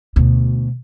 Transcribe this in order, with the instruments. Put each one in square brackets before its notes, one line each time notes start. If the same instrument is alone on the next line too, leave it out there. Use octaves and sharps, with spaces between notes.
[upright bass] D2 B2